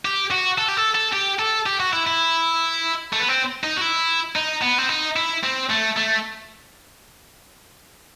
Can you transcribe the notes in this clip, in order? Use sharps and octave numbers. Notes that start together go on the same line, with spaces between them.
G4
F#4
A4
G4
A4
A4
G4
A4
G4
F#4
E4
E4
A3
B3
C4
D#4
F#4
E4
D#4
B3
C4
D#4
E4
C4
A3
A3